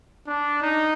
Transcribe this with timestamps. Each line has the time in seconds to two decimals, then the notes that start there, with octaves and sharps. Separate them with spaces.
0.27 D4
0.62 D#4